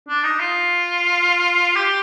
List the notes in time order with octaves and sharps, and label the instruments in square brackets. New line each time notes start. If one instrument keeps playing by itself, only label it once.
[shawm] D4
D#4
F4
G4